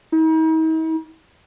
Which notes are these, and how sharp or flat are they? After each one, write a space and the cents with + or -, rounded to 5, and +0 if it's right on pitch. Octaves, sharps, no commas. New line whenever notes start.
D#4 +45